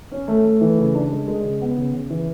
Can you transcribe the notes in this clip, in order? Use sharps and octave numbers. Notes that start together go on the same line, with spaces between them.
C#4
A3
A3
E3
C#3
D4
G#3
G#3
C#3
B3
C#3
C#3
E3